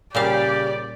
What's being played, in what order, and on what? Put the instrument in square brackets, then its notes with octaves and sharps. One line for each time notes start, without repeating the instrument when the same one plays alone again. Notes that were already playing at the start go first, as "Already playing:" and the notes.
[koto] A#2 G3 F5 [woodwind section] C#3 G4 [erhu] D5